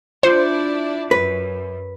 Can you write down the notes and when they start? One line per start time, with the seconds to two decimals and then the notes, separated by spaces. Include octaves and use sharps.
0.23 D4 E4 F4 C5 D5 G6 C#7
1.11 F#2 B4